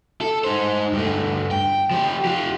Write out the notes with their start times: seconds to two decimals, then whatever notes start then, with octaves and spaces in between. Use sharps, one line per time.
0.21 A4
0.44 D#4 C5
0.93 G2 A3
1.51 G5
1.91 F3 G4
2.25 F4 G4